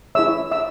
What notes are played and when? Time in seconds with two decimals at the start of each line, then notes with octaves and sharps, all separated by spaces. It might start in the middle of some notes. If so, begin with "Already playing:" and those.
0.15 E4 G#4 C#5 E5 E6
0.51 E5 E6